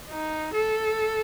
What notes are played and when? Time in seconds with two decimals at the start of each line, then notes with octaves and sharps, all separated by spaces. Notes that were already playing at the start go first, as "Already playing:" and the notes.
0.09 D#4
0.54 A4